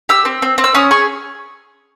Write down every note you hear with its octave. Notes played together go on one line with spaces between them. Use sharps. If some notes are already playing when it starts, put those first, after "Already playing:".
G4 E6
C4
C4
C4
E6
C#4 D#6
G#4 C#6